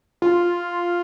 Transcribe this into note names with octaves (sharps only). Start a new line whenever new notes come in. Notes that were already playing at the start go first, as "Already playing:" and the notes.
F4